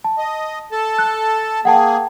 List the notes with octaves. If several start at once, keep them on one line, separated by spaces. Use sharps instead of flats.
A5
D#5
A4 A5
F#6
A#3 G#4 F#5 G5 A5